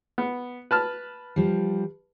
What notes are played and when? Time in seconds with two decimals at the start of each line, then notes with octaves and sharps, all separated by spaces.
0.18 B3
0.71 B4 A5 F6
1.36 F3 G3